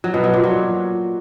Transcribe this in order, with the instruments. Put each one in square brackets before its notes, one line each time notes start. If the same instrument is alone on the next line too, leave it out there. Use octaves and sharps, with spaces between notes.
[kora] F#3
B2
F#3
A#2
F#3